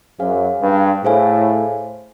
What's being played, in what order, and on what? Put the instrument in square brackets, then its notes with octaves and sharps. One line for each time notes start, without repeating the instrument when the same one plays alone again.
[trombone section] F#2 [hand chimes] G#4 C5 F5 G#5
[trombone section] G2
[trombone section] A2 [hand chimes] G#4 C5 F5 G#5